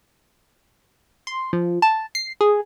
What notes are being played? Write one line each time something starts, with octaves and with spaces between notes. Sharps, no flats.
C6
F3
A5
C7
G#4